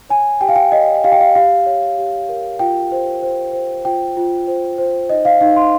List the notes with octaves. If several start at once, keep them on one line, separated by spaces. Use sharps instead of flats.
C#5 G#5
G4 G5
F5
G5
C#5 D#5
G4 F5
G5
F5
G4 F5
C#5
G4
A#4
F4 G5
C5
C5
C5
F4 G5
F4
C5
C5
D#4 D#5
F5
D#4 F5
C6